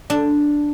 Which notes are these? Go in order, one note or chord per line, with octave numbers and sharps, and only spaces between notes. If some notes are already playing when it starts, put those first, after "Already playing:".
D4